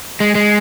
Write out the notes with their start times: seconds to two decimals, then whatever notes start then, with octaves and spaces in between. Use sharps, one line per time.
0.20 G#3
0.35 G#3